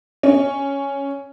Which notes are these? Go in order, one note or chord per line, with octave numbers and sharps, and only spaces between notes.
C#4